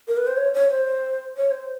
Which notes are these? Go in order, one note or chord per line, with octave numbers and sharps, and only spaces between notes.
A#4
B4
C5
C#5
C#5
C5
C#5
C5